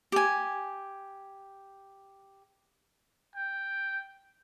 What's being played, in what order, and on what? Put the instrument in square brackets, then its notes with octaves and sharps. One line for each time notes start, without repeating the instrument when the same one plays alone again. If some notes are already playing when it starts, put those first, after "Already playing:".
[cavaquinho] G4 G#5
[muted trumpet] G5